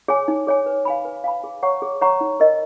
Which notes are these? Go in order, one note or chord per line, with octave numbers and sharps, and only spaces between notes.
G#4 C#5 G#5
D#4
G#4 C#5 G#5
B4
F5 G#5 B5
B4
F5 G#5 B5
G#4
C#5 F#5 A#5 C#6
G#4
C#5 F#5 A#5 C#6
D#4
A#4 D#5